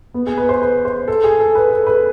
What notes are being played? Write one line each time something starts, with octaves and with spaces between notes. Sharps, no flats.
B3
G#4
B4
C5
B4
C5
A4
G#4
A4
B4
A4
B4